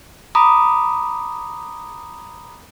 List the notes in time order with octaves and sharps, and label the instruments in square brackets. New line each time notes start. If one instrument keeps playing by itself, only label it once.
[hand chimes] A#5 B5 D6 D#6